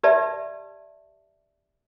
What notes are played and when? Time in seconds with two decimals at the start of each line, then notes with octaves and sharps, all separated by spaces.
0.03 G4 B4 D5 E5 A5